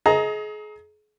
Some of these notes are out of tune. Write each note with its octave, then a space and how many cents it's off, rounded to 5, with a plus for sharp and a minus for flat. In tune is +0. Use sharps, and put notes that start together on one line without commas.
G#4 +35 D#5 +25 A#5 +5